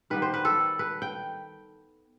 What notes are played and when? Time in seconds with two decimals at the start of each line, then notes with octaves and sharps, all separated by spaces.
0.10 D#3 G3 B3 B4
0.22 C5
0.34 B4
0.45 A4
0.79 B4
1.02 G5